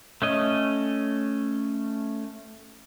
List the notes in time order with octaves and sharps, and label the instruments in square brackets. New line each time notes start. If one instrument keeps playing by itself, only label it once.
[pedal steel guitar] A3 C#4 D#5